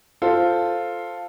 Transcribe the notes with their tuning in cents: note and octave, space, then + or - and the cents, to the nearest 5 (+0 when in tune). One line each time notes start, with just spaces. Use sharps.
F4 +0 A4 +5 C5 +0